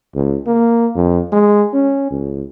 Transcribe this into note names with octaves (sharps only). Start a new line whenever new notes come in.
C#2
A#3
F2
G#3
C#4
C#2